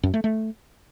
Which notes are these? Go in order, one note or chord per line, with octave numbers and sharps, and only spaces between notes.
F#2
A3
A3